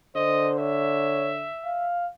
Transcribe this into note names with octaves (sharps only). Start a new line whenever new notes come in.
D3 C5 D#5
C#5 E5
F5